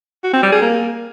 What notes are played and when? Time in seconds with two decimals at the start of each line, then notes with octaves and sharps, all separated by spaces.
0.24 F#4
0.33 C4
0.43 G3
0.52 G#4
0.62 A#3